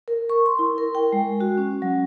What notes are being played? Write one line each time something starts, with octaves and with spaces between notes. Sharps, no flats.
A#4
C#6
C6
E4
A#4
G5
G#3
F#4
C#4
F#3